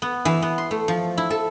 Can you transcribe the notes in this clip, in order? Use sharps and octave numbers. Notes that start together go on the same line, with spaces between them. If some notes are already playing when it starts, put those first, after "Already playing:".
B3
E3
B3
C6
A3
F3
E4
A4